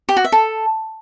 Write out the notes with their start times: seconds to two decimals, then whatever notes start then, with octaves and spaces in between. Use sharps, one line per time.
0.09 G4
0.17 F#4
0.24 E5
0.32 A4